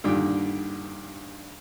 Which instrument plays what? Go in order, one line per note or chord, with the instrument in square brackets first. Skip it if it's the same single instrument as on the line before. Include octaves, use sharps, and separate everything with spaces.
[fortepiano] G2 A#2 D3 D#3 G4